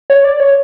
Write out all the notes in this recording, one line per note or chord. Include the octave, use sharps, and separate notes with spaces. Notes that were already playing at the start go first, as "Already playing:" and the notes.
C#5
D5
C#5